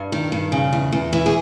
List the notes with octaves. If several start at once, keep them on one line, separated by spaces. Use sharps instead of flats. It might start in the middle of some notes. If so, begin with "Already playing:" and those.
Already playing: G2
D#3
G2
C#3
E2
E2
E3
G#4